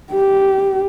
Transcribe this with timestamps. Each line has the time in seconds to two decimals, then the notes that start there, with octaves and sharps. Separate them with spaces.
0.11 G4